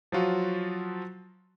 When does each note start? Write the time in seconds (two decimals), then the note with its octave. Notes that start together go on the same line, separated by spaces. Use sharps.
0.12 F3 F#3 F4 F#4